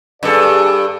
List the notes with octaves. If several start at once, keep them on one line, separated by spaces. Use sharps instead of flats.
G2 G#4 A4 D5 F5